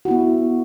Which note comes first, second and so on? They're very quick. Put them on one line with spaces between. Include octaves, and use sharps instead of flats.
F#4 E4 B3